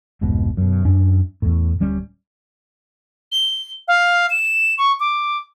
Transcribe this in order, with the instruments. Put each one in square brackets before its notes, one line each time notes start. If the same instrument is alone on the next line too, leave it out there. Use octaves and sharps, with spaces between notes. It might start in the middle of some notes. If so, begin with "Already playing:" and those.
[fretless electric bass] F1 C#2 G#2 B2
F#2 B2
F#2 C#4 D4
E2 A2
D1 G3 C#4
[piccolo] G7
F5
E7
C#6
D6